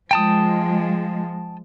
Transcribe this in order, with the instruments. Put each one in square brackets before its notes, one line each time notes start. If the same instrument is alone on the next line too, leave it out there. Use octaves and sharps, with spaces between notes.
[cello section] F3 G#3 [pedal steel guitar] G5 A5 D#6